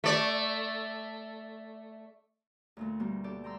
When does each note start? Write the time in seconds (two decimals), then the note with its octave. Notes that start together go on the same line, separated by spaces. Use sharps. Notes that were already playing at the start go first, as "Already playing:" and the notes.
0.04 A3 D5
2.77 D2 A#2 A3
2.99 B2 G3 A#3 B3
3.24 D4 G4 A4 D5
3.44 G5 A#5 C6 E6